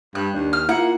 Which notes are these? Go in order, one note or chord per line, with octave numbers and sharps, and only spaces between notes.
G2 F#6
D#2 D4
F6
A#3 E4 F4 F#5